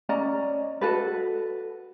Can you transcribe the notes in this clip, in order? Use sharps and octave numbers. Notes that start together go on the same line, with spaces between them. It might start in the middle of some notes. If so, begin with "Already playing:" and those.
C#4 D5 D#5 A#5
F#4 A4 B4